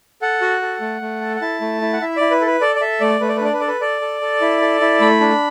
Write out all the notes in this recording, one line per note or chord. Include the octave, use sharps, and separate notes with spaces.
A4 F#5
F#4
A4
A3
A3
A4
F#5
E4 A5
A3
E4
F#5
E4 E5
E4 D5
B4
A4
B4
A4 D5
D5
A4 E5
A3 D5
A3 B4
D5
B4
D4 D5
B4
A4 D5
B4
A4 D5
A4
A4
E4
A4
E4
A3 B5
D4